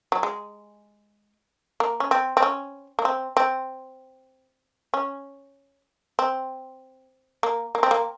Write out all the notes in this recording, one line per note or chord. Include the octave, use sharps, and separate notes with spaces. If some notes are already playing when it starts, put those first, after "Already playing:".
F#3
G#3
A#3
C#4
C4
C4
C#4
A#3
C4
C4
C#4
C4
A#3
A#3
C4
A#3